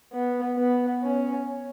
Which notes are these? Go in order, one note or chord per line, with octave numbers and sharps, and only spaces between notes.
B3
B3
C#4